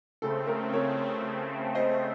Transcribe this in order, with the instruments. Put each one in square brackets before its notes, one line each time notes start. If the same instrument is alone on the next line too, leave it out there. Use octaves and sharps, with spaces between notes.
[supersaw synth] C#3 A3 C4 [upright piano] A4
[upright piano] A#4
A#4 C#5
C5 D#5